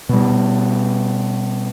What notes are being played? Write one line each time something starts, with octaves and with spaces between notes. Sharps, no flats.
B2 G3